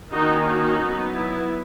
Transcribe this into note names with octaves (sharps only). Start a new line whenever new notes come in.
D#3 A#3 C#4 D#4 F#4
D#4 F#4
F#3 B3
E4